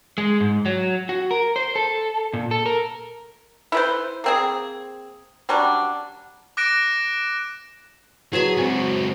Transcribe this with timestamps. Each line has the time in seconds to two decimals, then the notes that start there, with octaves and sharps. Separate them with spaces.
0.18 G#3
0.40 G#2
0.66 F#3
1.09 F#4
1.31 A#4
1.56 C5
1.76 A4
2.33 A#2
2.51 A4
2.66 A#4
3.72 E4 B4 C5
4.24 A#3 C4 G#4
5.49 F#3 G3 C#4 D4
6.57 D6 F#6 A#6 D7 E7
8.33 F#3 E4 G#4 B4 C5 A5 B5
8.58 C#2 C4 F#4 C5